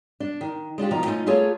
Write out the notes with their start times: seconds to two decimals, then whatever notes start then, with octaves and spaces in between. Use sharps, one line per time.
0.20 D4
0.41 D#3
0.78 G#3 D4 F4 G4
0.91 B2 D#3 F3 A#5
1.06 A3 C#4 D#4 F4
1.26 A3 A#3 F4 G#4 C#5